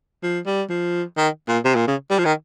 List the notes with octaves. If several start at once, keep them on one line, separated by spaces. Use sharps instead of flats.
F3
G3
F3
D#3
A#2
C3
A#2
C#3
G3
F3
D#3